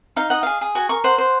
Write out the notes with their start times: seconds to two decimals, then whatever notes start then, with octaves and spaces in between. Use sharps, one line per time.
0.16 D#4 F5
0.30 D#5 F#5
0.43 G#4 F5
0.61 G#4
0.75 F#4 G#5
0.89 A#4 C#6
1.04 C5 F#5
1.18 C5